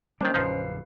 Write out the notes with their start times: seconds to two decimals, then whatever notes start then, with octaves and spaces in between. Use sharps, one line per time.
0.21 D#3 G3 A#3 C#4 D4 C5
0.34 A#1 F#2 D3 F3 D#4 B4 F5 C7